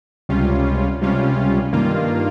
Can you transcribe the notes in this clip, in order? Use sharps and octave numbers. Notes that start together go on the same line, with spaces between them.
C#2 C3 G3 C#4 F4
C#2 C3 G3 C#4 F4
G2 D#3 A#3 F4